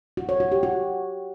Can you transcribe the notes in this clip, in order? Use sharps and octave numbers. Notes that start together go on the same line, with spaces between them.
F#4
C#5
F#4
G4
F#4